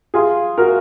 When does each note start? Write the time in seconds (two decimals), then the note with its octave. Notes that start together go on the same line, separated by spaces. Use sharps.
0.14 F4 G#4
0.58 F#4 A#4